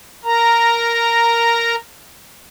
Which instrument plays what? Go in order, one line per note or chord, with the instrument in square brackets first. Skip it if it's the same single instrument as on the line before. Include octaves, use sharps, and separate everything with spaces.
[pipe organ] A#4 A#5